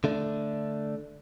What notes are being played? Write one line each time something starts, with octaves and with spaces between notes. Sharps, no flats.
D3 A3 D4